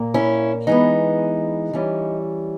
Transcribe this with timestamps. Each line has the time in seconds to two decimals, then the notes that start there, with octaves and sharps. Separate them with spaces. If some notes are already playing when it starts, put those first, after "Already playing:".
Already playing: A#2 A#3
0.14 C#4 E4
0.67 E3 G#3 B3 D#4
1.73 E3 G3 C#4